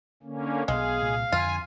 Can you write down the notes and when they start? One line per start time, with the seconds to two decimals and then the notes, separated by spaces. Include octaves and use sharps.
0.23 D3 A#3 C#4
0.68 B1 B2 G#3 B3 G#4 F5
1.02 C2 A#2
1.32 F2 D3 F4 G#5